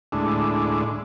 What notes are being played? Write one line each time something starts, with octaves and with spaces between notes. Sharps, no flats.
D2 A2 G#3 D4 E4